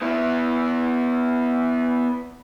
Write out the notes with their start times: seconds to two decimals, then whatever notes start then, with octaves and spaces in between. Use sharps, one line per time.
0.02 B3 E4